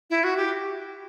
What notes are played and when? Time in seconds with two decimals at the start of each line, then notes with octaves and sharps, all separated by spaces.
0.10 E4
0.24 F#4
0.37 G4